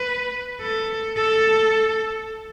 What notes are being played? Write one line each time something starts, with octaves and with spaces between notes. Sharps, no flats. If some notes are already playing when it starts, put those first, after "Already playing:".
Already playing: B4
A4
A4